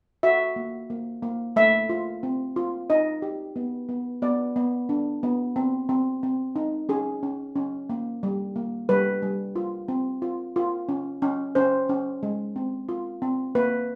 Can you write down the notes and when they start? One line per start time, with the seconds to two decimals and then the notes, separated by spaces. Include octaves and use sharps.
0.23 F#4 E5
0.56 A#3
0.90 A#3
1.23 A#3
1.56 A3 E5
1.89 F4
2.23 C4
2.56 F4
2.90 D#4 D#5
3.22 G4
3.56 B3
3.89 B3
4.22 B3 D5
4.56 B3
4.89 D4
5.23 B3
5.56 C4
5.89 C4
6.23 C4
6.56 D#4
6.89 C#4 G#4
7.23 C#4
7.56 C#4
7.90 A#3
8.23 G3
8.56 A#3
8.89 G3 B4
9.22 G3
9.56 F4
9.88 C4
10.22 F4
10.56 F4
10.89 C#4
11.22 C#4
11.55 C#4 C5
11.89 C#4
12.23 G#3
12.56 C4
12.89 F4
13.22 C4
13.55 A#3 B4